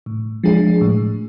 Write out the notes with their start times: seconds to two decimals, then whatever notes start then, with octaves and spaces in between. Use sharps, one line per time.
0.06 A2
0.44 F3 G#3 D4 G#4
0.81 A2